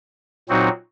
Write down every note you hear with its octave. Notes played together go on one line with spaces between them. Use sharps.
A#2 F#3 C4 D#4 F#4